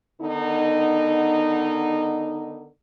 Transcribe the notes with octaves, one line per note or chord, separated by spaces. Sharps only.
D3 D#3 B3 D#4